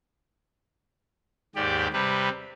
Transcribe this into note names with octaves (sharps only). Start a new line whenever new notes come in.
D#2 G#2 G4 D5
C3 G3 B4